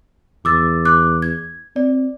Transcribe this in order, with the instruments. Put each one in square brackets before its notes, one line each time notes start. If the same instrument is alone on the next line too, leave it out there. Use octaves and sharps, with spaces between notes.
[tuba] E2 [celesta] D6 E6 A6
[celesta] D6 F#6
G#6
[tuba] C4 [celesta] D5